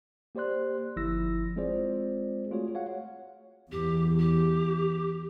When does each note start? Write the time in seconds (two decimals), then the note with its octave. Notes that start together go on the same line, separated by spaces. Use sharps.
0.35 A#3 G4 C5 D5 C6 F#6
0.96 G1 F3 E4 E6 A#6
1.56 G#3 C4 F4 G#4 C5 D5
2.51 A3 F4 F#4 G#4 C#5
2.75 C#5 F5 F#5
3.72 E2 G4
4.19 G4